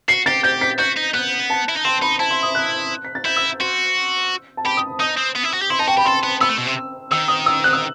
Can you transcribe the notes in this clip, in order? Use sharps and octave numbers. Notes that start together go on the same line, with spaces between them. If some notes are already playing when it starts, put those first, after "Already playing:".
F#4 C7
G4 A6
G4 G6
B6
F#4 G6
D#4
B3 F#6
A5
E4
D#4
C4 C6
D#4 B5
E4 A5
C6
D#6
F#6
B6
A6
E4 G6
E6
F#4 C6
A5
G4 B5
D#6
D#4 D#6
C4
B3
E4
F#4
G4
E4 C6
D#4 A5
F#4 G5
G4 B5
A4 C6
B3
B3 E6
A3
B2
C3
D#3 E6
D#6
E6
F#6
E6